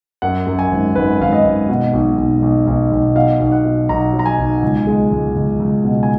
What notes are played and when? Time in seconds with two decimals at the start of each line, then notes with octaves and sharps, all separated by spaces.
0.22 F#2 F#5
0.47 F#2
0.59 G#5
0.71 G#1
0.95 G#1 B4
1.20 G#1 F5
1.33 D#5
1.45 G#1
1.69 B2
1.93 B1
2.18 B1
2.42 B1
2.67 B1
2.92 B1
3.15 B2 F5
3.40 B1
3.52 F#5
3.65 B2
3.89 B1 A#5
4.13 F#3
4.19 A#5
4.26 G#5
4.38 B1
4.62 C#2
4.87 G#3
5.12 C#2
5.36 C#2
5.60 C#2
5.84 B2
6.03 G#5